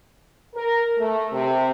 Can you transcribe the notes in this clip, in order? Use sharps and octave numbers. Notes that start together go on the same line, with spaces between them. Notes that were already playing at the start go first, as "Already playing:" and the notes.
A#4
A3
C3